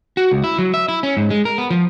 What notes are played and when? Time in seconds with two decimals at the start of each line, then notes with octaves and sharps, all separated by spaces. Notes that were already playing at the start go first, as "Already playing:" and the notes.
0.17 F#4
0.32 C#2
0.44 E4
0.58 F#3
0.74 E5
0.88 E4
1.03 C#4
1.17 G#2
1.30 G#3
1.45 A#4
1.58 B3
1.70 F3